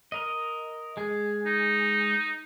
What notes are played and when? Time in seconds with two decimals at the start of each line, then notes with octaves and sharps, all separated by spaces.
0.12 A#4 D#5
0.97 G#3 G#4
1.46 D#4